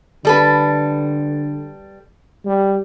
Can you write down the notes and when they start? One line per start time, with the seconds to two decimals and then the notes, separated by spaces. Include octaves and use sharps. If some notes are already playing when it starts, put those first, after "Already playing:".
0.25 D3 G3 A4 B4
2.45 G3